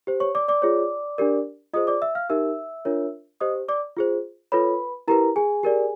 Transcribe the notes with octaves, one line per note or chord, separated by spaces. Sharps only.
G4 C5
C#5 C#6
D5 D6
D5 D6
F4 G#4 C#5
D4 G4 A#4 D5
F4 G#4 C5 D#5 D#6
D5 D6
E5 E6
F5 F6
D#4 G4 A#4 E5 E6
D4 F4 A#4 C#5
G4 C5 D#5 D#6
D5 D6
F4 G#4 C5
F4 A4 B4 C#5 B5
E4 G4 A#4 B4 A#5
G#4 G#5
G4 A#4 D5